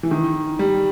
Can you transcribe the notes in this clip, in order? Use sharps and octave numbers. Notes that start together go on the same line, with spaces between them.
E3
D#3
G3